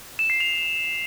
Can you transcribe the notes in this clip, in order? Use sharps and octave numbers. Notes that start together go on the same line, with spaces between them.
E7
C7
F7